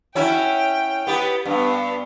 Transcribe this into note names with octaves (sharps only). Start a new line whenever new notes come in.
C#4 E4 F#4 G5
B3 G4 B4
G2 B3